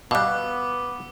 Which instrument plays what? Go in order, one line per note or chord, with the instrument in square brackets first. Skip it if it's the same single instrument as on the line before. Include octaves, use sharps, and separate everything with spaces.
[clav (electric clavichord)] B2 G3 [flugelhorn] B3 [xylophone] F5 F#6 [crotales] D6 E6